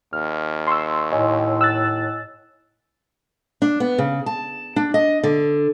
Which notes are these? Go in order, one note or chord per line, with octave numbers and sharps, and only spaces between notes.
D#2 F6
C6 C#6 E6
A2 C#5 D#5 G#5
E6 F#6 A6
D4
B3
C#3
A5
D4
D#5
D3